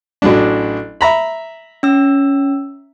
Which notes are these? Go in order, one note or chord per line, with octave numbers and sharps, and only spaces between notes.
A1 F#3 D4
E5 A#5 B5
C#4 E6